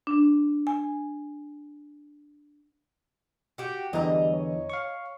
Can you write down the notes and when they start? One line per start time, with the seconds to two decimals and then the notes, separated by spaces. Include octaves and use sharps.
0.07 D4
0.67 G#5
3.58 F#4 G4
3.93 E2 D3 E3 G3 D#5 A#5
4.32 C#5
4.70 F5 C#6